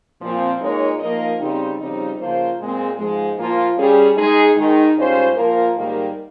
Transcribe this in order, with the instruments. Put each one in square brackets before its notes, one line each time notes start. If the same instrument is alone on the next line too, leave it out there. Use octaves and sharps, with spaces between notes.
[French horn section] A#2 F3 C4
A#2 G#3 D#4 A#4 C#5
F3 A#3 D#4 A#4 D#5
C#3 G3 C4 D#4
F2 C#3 G3 C4 D#4
C#3 F3 A#3 F4 C5
A#2 G#3 C4
G#2 F3 G#3
A#2 F3 A#3 F4
G3 C#4 G#4
G#3 D#4 G#4
D#3 G#3 D#4
G#2 G3 C#4 F4 C5
A#2 F3 A#3 F4 A#4
G#2 D#3 G3 A#3